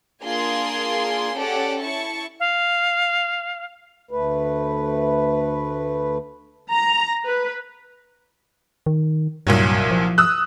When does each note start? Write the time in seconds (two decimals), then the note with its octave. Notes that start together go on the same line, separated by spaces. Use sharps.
0.23 A#3 D4 F4 G#4 G#5 C6
1.38 C#4 G4 A4 C#5 D5 F#5
1.81 E4 A5 C#6
2.40 F5
4.11 D2 A3 B4
6.70 A#5
7.25 B4
8.86 D#3
9.47 C2 G2 A#2 F#3
9.91 F3
10.18 D#6 E6 F#6